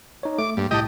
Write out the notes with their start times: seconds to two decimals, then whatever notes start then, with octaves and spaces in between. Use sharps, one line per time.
0.23 D#4 C#5
0.38 A3 D6
0.57 G2 A#3
0.71 C2 A2 G4 D#5 A5